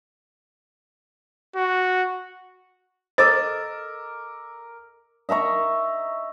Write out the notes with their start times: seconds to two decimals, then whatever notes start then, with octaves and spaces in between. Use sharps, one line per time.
1.56 F#4
3.18 A4 A#4 C5 D#5 D6 E6
5.29 D#5 E5 A#5 C#6